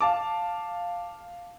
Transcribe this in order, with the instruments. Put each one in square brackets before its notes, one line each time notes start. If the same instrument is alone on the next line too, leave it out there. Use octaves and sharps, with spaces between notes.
[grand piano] F5 A5 D6